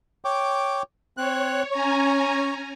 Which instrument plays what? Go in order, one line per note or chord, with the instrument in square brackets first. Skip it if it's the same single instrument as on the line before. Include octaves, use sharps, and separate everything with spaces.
[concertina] C#5 G5 D6
[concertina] C4 F#6 [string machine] C#5
[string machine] C#4 G#5 A#5 [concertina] C#5